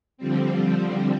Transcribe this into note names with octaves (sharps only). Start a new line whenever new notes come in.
D3 F3 G3 C4